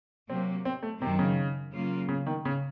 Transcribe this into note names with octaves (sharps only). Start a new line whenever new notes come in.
C3 F#3 A#3 C4
C4
A3
F#2 C3 D#3 F#3 C4
C#3
C#3 F#3 A#3 F4
C#3
D#3
C#3